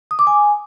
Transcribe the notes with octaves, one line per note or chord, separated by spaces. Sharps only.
D#6
D6
G#5